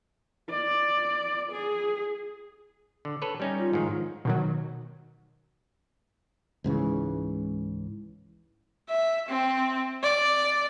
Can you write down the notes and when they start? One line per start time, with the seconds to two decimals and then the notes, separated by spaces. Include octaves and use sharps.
0.50 D5
1.52 G#4
3.05 D3
3.22 A4 B4 C#5
3.40 G3 C#4 D#4
3.58 F4
3.73 G#2 D#3 F3
4.25 B2 D#3 F#3
6.64 C#2 G#2 C#3 E3
8.89 E5
9.29 C4
10.03 D5